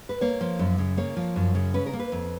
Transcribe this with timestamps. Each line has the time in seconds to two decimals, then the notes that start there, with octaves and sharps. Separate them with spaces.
0.09 B4
0.21 A#3 C#5
0.41 F3
0.59 F#2
0.78 C#3
0.97 A#3 C#5
1.17 F3
1.36 F#2
1.55 C#3
1.74 C#4 B4
1.86 A#4
1.93 A#3
1.99 B4
2.12 F2